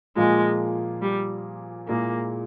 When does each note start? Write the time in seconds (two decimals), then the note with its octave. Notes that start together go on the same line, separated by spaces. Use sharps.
0.16 A#2 F3 G#3 A#3 F4 G#4
1.02 G3
1.88 A#2 G#3 A#3 E4 G#4